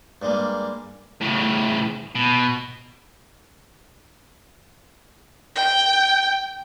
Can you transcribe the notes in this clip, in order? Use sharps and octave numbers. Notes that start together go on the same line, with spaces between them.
G2 G3 G#3 A#3
A2 C#3
B2
G5